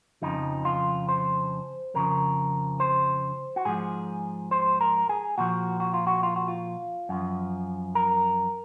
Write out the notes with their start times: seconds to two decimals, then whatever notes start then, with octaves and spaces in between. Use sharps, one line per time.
0.22 F2 C#3 F3 D#4
0.65 F4
1.09 C5
1.94 F2 C#3 F3 A#4
2.80 C5
3.56 F#4
3.65 G#2 F3 G#4
4.51 C5
4.81 A#4
5.09 G#4
5.38 A#2 F3 F#4
5.80 F#4
5.94 F4
6.07 F#4
6.23 F4
6.36 F#4
6.48 F4
7.09 F#2 F3
7.95 A#4